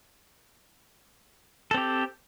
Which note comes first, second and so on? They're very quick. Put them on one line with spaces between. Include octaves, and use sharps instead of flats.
A4 C4 G4